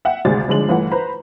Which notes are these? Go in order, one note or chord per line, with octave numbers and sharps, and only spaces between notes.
E5 F#5 G5
G#1 D2 C3 G#4 D5 A6
G1 D3 F3 G#3 D4 F#7
G1 E3 A3 F#5
B4 C5 A#5 B5